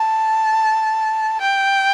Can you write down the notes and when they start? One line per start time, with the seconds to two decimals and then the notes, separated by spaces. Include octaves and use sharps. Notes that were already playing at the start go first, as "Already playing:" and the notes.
Already playing: A5
1.41 G5